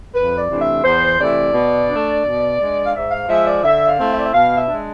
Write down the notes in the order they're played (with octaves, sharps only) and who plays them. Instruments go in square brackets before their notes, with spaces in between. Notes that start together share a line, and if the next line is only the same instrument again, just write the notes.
[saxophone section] F2 B4
D5
C3 E3 A3 D4
E5
E2 C5
C3 E3 A3 E4 D5
B2
A3 D4
B2
G#3 D4
F5
G#2 E5
F5
F3 G#3 E5
D5
D3 E5
F5
A3 C4 E4
E5
D5
E5
B2 F5
E5
G#3 D4